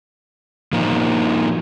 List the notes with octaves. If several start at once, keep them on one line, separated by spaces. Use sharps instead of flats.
F3 A#3 D#4